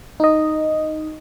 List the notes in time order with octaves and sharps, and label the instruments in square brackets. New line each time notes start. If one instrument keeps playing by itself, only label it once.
[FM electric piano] D#4 D#5